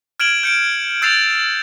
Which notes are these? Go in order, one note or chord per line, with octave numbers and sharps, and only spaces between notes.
F6 G#6 D7 E7 F#7
G6 C#7 D7
E6 G6 A6 C7 E7 F7